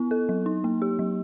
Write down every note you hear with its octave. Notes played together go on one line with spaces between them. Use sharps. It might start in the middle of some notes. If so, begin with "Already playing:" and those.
Already playing: B3 E4
A4
F#3
D#4
A#3
G4
F#3